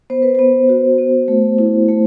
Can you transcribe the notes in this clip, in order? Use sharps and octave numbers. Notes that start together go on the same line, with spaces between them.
B3 C5
B4
B3 C5
F#4
B3
A3
E4
A3